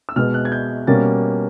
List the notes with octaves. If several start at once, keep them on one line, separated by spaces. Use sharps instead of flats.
E6
B2 G#3 B3 F6
F#6
G#6
G6
B2 G3 A#3 C#4 A6